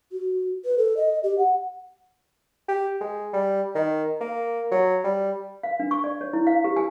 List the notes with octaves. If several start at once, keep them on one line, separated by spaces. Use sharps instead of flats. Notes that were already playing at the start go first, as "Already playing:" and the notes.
F#4
B4
A4
D#5
G4
F#5
G4
G#3
G3
D#3
A#3
F#3
G3
F5
D4
C#6
D5
C#5
E4
F5
G4
G#5